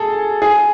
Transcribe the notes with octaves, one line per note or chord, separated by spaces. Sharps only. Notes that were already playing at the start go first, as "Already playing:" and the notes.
Already playing: G#4 A4
G#4